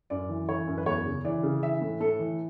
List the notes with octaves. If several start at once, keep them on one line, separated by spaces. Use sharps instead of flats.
F#2 D5
E3
E3 C#5
F#2
B4
E2 C#5
C#3
E3 D5
C#3
E3 E5
A2
A2 A4
E3